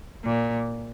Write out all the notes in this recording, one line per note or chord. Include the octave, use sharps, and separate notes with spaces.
A#2